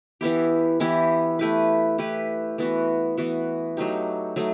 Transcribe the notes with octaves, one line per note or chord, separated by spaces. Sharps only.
E3 B3 E4 G4
E3 B3 E4 G4
A3 E4 G4 B4
A3 E4 G4 B4
E3 B3 F#4
E3 B3 F#4
F#3 A3 D#4 G4
F#3 A3 D#4